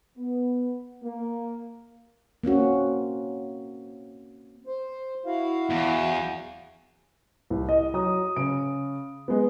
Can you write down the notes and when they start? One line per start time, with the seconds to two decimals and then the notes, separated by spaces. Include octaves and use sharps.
0.17 B3
1.03 A#3
2.44 A#3 C4 C#4 F#4
4.67 C5
5.26 E4 F#4 F5
5.70 E2
7.50 C2
7.69 D#5
7.94 F#3 A#5 D#6
8.36 C#3 D7
9.28 G#3 B3